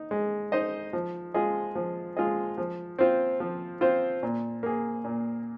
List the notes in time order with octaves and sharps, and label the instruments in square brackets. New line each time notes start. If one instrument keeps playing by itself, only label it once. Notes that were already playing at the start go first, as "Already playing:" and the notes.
Already playing: [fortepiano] D#4
G#3
D#4 C5 D#5
F3
G#3 F4 G#4 D#5
F3
G#3 F4 G#4 D#5
F3
C4 F4 C5
F3
C4 F4 C5
A#2
A#3 G#4
A#2